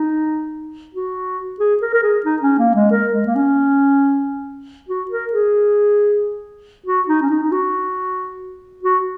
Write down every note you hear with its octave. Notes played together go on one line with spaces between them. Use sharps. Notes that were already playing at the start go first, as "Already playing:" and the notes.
Already playing: D#4
F#4
G#4
A#4
A#4
G#4
D#4
C#4
A#3
G#3
A#4
G#3
A#3
C#4
F#4
A#4
G#4
F#4
D#4
C#4
D#4
D#4
F#4
F#4